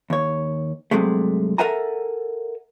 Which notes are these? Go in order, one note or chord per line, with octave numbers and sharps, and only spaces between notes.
D#2 C#5
G2 C3 F#3 G#3 A3
A4 A#4 E5 F#5 G#5 A#5